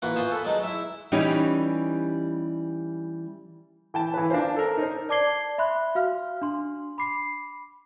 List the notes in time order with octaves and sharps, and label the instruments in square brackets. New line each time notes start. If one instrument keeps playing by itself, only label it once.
[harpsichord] E3 A#3 F4 F#4 B4
B3 F4 C5 G#5 C6
A4 B4
F#3 G#3 D#4
E4 E5
[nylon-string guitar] E3 G3 C#4 D#4 G4
[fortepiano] E3 G5 A5
E3 B4
D4 F4 A#4 C5
A4 A#4
D#4 A#4 C5
[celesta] D5 A5 D6 G#6 C7 G7
E5 B5 C6 F#6
F#4 F5 F6
D4 C6
B5 D6 C7